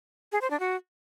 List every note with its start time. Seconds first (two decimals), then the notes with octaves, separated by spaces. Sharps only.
0.32 G#4
0.41 C5
0.51 D4
0.60 F#4